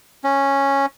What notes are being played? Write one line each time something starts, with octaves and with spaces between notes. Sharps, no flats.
C#4